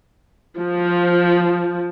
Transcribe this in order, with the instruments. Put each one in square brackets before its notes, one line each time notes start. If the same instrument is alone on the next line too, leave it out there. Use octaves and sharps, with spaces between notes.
[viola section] F3